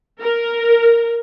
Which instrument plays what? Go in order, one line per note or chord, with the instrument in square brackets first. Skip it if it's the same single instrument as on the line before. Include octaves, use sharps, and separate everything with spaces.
[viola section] A#4